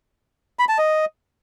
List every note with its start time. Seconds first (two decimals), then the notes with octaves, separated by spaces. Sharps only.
0.59 B5
0.69 A5
0.78 D#5